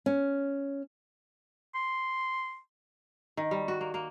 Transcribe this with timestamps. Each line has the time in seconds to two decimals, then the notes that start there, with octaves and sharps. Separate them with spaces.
0.06 C#4
1.75 C6
3.37 D#3
3.51 G3
3.68 F#4
3.81 A#3
3.94 A#3